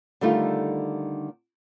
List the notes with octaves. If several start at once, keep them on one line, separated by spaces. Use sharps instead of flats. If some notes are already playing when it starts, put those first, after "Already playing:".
D3 D#3 G3 A3 D#4 F4